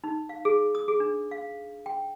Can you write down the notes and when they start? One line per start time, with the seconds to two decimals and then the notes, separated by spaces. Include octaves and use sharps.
0.04 D#4
0.29 F5
0.45 G#4
0.75 D#6
0.88 G#4
1.00 D4
1.31 F5
1.86 G5